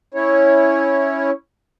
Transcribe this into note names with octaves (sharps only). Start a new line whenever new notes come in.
C#4 E4 C#5